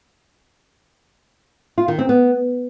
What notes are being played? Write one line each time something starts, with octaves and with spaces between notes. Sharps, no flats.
F4
D#3
C4
B3